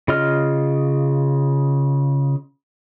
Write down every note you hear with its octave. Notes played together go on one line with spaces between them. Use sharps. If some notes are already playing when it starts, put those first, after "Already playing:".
C#3 F4 D#5 F6